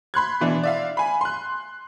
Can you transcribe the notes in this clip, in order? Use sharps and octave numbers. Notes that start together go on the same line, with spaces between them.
B5 C6 F#6 G#6
B2 E3 D4
D5 E5 F5
G#5 B5
C6 F#6